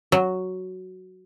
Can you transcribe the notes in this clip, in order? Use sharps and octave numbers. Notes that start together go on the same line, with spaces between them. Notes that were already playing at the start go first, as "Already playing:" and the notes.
F#3